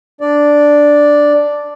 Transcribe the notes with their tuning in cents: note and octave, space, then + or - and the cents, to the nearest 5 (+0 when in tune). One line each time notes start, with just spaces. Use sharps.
D4 +0 D5 +0